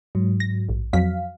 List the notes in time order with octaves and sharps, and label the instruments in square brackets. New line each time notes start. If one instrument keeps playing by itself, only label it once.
[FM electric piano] G#2 F#3
[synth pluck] A#6
A#1
[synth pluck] F2 F#3 B6 [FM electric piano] F5